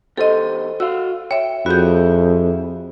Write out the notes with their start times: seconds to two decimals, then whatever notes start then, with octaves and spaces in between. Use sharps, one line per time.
0.17 E2 G4 A4 C5 D#5
0.80 F#4 F5 E6
1.31 C#5 E5 G5
1.66 F2 E4 F#4 G#4 G6